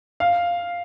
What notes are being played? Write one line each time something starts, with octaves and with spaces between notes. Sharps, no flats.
F5